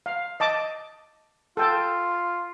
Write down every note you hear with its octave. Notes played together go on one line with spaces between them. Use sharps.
F5
D#5 A5 D6
F4 A4 G5 A5